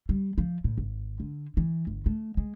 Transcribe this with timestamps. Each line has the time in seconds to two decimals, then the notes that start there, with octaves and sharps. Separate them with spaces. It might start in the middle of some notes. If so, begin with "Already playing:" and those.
0.09 G3
0.38 F3
0.64 A2
0.78 G#1
1.20 D3
1.57 E3
1.87 G1
2.06 A3
2.37 G#3